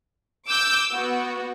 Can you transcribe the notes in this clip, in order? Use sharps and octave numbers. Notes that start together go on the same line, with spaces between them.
D6 E6 G6
B3 F#4